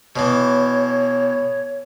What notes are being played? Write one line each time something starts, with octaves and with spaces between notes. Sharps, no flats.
B2 E3 C#5